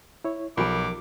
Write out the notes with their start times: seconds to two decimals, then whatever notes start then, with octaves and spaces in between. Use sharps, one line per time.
0.24 E4 C#5
0.57 B1 F3 F4 G4 A#4 G#5 D6